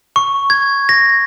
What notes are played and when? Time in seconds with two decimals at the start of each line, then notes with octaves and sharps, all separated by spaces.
0.16 C#6
0.50 G#6
0.89 A#6